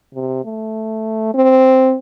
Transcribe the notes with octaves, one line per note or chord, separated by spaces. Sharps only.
C3
A3
C4